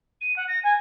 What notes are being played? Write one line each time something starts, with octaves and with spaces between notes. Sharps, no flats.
D#7
F#5
A#6
G#5